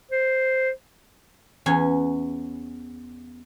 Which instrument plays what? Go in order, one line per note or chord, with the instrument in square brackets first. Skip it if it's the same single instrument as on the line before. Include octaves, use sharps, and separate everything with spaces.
[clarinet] C5
[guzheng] E2 C#4 G#5